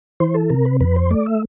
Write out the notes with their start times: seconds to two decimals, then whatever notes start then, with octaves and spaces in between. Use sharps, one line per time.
0.20 E3 C5
0.34 A4
0.50 C3 A#4
0.65 B4
0.81 F2 B4
0.96 C5
1.11 A3 D5
1.26 E5